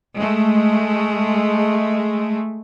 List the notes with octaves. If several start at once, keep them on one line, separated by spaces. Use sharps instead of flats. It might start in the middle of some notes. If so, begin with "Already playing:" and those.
G#3 A3